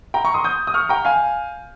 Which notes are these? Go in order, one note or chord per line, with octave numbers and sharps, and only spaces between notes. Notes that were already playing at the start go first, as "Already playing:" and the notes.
G5 A#5
A#5 C#6
C6 D#6
D#6 G6
D#6
C#6 F6
G5 A#5
F5 G#5